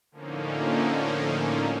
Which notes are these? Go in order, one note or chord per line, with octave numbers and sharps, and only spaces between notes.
A2 D3 F3 A#3 C#4 D#4